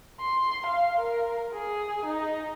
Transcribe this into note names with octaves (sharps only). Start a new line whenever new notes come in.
C6
F5
A#4
G#4
D#4